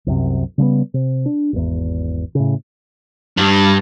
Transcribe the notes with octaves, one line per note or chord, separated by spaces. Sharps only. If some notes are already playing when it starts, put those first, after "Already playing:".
C2 F#2 C3
C#3 G3 A3 B3
C3
D4
G#1 E2
A2 C#3
G2